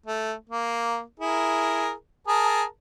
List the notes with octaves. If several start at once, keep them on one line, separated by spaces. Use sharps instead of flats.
A3
A#3
E4 G#4 A#4
G#4 A#4 A5